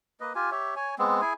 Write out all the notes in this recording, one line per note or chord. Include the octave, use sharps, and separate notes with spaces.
A#3 B4 D#5
F4 G4 G#5
G4 C#5 E5
C#5 G#5
G#3 B3 C4
E4 G#4 G#5